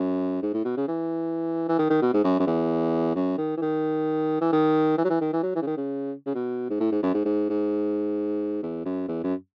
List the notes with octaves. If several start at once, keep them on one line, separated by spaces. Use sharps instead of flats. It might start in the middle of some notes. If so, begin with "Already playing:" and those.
Already playing: F#2
G#2
A2
B2
C#3
E3
E3
D#3
D#3
B2
G#2
F#2
F#2
E2
F#2
D#3
E3
D#3
E3
D#3
E3
F#3
E3
D#3
E3
F#3
E3
C#3
D#3
C#3
C#3
B2
G#2
A2
G#2
F#2
G#2
G#2
G#2
E2
F#2
E2
F#2